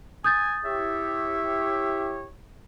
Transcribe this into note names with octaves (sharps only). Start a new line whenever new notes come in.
G#5 D#6 G6 A6
E4 G4 C#5 E5